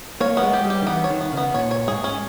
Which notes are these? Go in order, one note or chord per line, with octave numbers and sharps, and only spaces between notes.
A#3 C#5
B3
G#3
G4
G3
G4
D#3
E3 B3
C#5
D#3
B3
C#3
B3
A#2 C#5
C#5
G#2 G#4
C#4